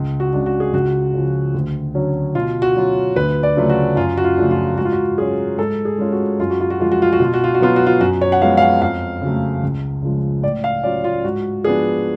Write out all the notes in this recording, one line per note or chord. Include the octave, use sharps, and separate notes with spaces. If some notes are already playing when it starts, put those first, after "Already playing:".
Already playing: C#2
F#4
C#3 G#3 D4
F#4
G#4
C#2 F#4
C#3 F3
D2
D3 F#3 C#4
B2 F4
F#4
F#3 C#4 F4
D2 B4
D5
C#3 F#3 A3 F4
F#4
F#2 F4
F#4
F4
C#3 F3 A3 D4
F4
G#2 F#4
F4
F#4
F#3 C#4 G#4
G#2 A4
G#4
G#3 C#4 F4
F#4
F#2 F4
F#4
F4
F#4
F3 G#3 F4
F#4
F4
F#4
B2 F4
F#4
F4
F#4
F#3 B3 F4
F#4
F4
F#2 F#4
C#5
F#5
F3 G#3 B3 F5
F5
F#5
F2 F5
C#3 F#3 A3
C#2
C#3 F3 G#3
A2 D5
F5
F#3 C#4 F4 D5
F4
G#2 F#4
F3 B3 D4 G#4